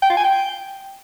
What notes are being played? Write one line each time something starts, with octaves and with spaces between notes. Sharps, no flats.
G5
F4
G#5
G5